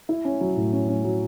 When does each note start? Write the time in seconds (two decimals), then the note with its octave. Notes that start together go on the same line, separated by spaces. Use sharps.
0.09 E4
0.25 C#4
0.41 F#3
0.56 A2
0.73 C#4
0.89 C#4
1.04 F#3